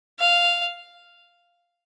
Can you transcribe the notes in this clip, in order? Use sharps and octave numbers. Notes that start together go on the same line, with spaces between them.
F5